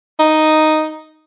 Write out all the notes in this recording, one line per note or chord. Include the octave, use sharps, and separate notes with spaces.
D#4